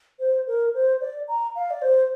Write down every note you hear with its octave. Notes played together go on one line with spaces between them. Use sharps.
C5
A#4
C5
D5
A#5
F5
D5
C5